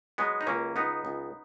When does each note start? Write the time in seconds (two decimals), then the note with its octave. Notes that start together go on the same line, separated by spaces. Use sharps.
0.18 F#3 G#3 B3
0.41 D#4
0.47 C#2 A#3 C#4
0.76 C#2 B3 D#4
1.05 C#2